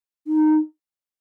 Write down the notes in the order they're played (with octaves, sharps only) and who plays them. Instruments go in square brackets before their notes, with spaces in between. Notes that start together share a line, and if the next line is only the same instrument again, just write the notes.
[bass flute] D#4